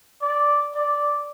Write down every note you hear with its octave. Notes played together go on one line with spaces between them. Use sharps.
D5
D5